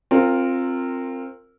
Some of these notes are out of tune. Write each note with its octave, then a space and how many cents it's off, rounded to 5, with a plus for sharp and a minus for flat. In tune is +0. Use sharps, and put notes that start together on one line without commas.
C4 +15 F4 +0 A#4 -25